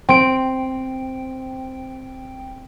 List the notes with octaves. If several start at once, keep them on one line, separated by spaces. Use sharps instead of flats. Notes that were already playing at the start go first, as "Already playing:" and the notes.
C4 G5 D7